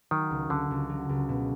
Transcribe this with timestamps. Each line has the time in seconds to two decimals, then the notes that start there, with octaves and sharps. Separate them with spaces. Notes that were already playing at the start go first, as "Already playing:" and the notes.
0.11 D#3 F#3
0.30 C#2
0.50 C#2 D3
0.71 C#2
0.89 F#3
1.09 C#2
1.29 B2